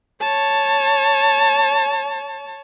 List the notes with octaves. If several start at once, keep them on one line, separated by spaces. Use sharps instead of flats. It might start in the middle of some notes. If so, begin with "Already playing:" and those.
C#5 A5